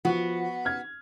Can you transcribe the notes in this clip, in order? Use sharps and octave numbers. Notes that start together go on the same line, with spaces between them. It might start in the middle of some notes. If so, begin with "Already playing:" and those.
F3 B3 F#4
F6 G#6